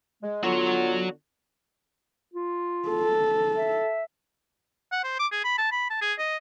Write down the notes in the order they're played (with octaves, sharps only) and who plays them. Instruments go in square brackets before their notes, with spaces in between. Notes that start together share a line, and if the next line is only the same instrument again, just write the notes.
[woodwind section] G#3
[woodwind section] D3 B3 F4 [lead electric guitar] F#4 C#5
[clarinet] F4
[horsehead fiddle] A4
[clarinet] E5
[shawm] F#5
C5
D6
G#4
B5
A5
B5
A5
G#4
D#5